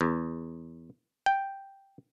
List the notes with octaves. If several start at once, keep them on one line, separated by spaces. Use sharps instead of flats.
E2
G5